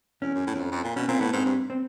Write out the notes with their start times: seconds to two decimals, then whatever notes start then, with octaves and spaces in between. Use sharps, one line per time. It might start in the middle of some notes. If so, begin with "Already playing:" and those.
0.22 E2 C#4
0.34 F#2
0.47 A2
0.54 E2
0.59 F2
0.72 F2
0.83 A#2
0.96 B2 C#4
1.08 A#2 C4
1.20 A2 B3
1.33 G#2 C4
1.45 G2
1.70 C4